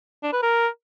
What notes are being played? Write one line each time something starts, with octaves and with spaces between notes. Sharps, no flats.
D4
B4
A#4